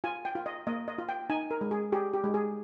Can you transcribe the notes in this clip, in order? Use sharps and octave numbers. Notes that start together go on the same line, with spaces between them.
F4 G#5
G5
F4
D#5
A#3 D#5
D#5
F4
G5
D#4 G#5
A#4
G#3
G#4
G4 G#4
G4
G#3
G#4